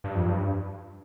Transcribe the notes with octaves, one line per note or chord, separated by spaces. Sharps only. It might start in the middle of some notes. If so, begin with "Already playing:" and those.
G2
F2
G2